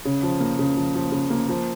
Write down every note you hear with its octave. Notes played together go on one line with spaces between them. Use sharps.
C#3
F3
A#3
C#3
F3
F3
C#3
A#3
F3